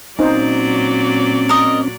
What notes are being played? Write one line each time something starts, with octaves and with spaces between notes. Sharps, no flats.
A#2 F#3 C4 C#4 D#4 C5 D5
A#4 D#5